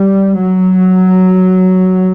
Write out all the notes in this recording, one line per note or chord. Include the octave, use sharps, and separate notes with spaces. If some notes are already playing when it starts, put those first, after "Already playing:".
Already playing: G3
F#3